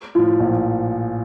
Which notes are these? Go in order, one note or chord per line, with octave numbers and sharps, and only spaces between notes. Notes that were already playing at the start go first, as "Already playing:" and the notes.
A2 F3
A#1